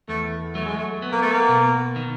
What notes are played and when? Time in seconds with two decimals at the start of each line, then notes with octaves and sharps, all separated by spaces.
0.09 E2 A3
0.55 F#3 A3
0.66 G#3
0.77 A3
1.02 B3
1.12 A#3
1.22 A3
1.31 A#3
1.48 B2
1.96 D#3